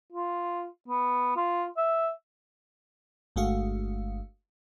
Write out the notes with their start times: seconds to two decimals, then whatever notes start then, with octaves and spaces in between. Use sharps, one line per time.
0.13 F4
0.88 B3
1.36 F4
1.77 E5
3.36 G1 G#3 A3 F#4 F5